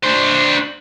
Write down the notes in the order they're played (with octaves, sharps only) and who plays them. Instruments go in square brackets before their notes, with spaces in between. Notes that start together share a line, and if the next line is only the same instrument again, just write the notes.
[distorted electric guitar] D4 C5